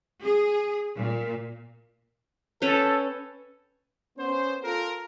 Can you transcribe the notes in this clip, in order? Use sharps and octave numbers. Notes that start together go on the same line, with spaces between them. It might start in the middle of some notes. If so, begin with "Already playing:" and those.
G#4
A#2
C#4 A4 B4 G5
B3 C#4 C5
F4 A4 A#4